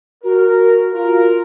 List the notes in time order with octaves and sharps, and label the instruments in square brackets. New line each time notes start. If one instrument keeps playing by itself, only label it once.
[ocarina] F#4 [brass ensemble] A#4
[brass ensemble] F4 A#4